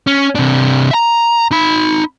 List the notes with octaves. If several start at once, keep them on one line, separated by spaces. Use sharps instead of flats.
C#4
C3 D4
E5 A#5
D#4 B5